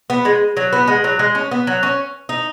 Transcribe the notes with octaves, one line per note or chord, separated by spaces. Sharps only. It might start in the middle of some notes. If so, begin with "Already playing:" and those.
B3
G#3
F#3
B3
G#3
F#3
G#3
C#4
B3
F#3
C#4
D#4